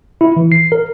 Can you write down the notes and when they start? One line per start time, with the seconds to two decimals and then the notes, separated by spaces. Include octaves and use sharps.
0.21 E4
0.37 E3
0.52 C7
0.72 A#4